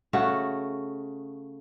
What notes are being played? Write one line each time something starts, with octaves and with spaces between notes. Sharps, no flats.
C#3 A3 F#4